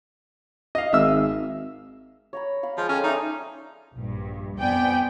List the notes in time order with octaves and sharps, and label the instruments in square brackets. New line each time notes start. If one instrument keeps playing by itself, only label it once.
[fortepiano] D#5 F5
[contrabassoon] G#1 [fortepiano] E5 E6
[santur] C#5 A#5 B5
F5 B5
[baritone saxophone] F3 [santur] G#3
[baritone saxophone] C#4 [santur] A4 C#5 G5
[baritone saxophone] D#4 [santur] D5 E5 C6
[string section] A#1 G2
F2 B3 D5 G5 G#5